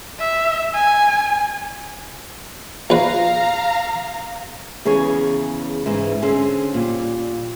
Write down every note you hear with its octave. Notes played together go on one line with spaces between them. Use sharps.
E5
G#5
A#1 B4 F5 A#5
E2 C#3 G#4 C#5 G#5
G#2 C#3 E3
D3 C4 C#4 G#4 G#5
A#2 G3